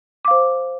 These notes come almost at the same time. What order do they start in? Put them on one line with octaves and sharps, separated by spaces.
D6 F5 C5